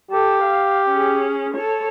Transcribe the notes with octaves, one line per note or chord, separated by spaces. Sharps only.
G4 A4
F5
C#4 G#4
A4 C#5